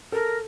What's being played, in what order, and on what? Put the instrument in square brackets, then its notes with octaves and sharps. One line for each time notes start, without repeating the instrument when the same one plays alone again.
[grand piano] A4 [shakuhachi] A#4